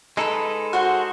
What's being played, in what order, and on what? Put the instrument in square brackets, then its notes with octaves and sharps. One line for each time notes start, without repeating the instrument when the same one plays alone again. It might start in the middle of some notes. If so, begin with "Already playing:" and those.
[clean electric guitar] G#3 D#4 A4 [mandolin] B4 B5
[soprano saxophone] F#4 [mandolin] C5 F#5